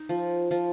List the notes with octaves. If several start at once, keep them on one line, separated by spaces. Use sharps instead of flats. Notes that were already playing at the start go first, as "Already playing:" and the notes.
Already playing: D#4
F3
F3